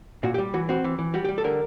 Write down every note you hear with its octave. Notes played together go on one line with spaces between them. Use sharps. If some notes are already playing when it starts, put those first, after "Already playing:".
A#2 F#4
G4
G3
E3 F#4
C4 F#4
E3
E3
G3 F#4
G4
G3
A4
D3 A#4